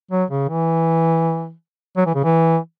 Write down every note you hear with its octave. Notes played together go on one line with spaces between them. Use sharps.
F#3
C#3
E3
F#3
E3
C#3
E3